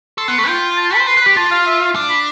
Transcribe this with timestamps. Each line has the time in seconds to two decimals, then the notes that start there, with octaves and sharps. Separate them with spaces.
0.18 A4 C6
0.28 B3 C6
0.38 A3 B5
0.48 F4 G5
0.77 A5
0.92 B5
0.98 C5
1.07 B4 C6
1.17 B4 B5
1.26 G4
1.36 F4 A5
1.51 F5
1.66 E5
1.80 F5
1.95 D4
2.09 B5